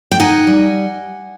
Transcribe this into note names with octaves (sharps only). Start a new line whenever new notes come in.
G5
D#4 F#5 G#5
G3